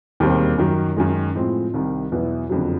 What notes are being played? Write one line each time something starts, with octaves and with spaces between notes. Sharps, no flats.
E1 D#2 D#3 G3 C4
F#2 D#3 F#3
F#2 D#3 G#3
A2 F3 G#3 C4
C2 C3 D#3 G3
E2 B2 F#3 B3 E4
F#1 F2 D3 F#3